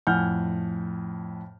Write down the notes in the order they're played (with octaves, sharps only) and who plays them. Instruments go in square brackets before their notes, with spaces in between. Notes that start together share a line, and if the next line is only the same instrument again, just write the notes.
[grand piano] F2 A2 F#5 G#5 F6 G6